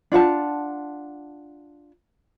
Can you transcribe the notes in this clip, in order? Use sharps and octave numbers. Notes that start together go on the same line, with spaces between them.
D4 F4 F#5 A5